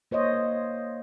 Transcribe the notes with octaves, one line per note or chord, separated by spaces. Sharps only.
A#3 C5 C#5 D#5